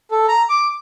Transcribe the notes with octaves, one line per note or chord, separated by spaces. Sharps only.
A4
A#5
D6